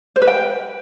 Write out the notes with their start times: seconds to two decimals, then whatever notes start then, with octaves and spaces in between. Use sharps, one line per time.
0.16 C5
0.22 B4
0.27 G5